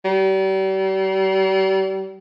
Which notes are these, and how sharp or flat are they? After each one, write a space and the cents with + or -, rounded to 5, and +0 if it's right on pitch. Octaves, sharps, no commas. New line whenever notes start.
G3 -40